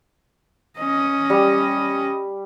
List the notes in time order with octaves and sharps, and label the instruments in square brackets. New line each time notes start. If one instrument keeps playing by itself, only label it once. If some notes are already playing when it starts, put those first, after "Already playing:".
[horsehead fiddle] C#4 D#5
[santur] G3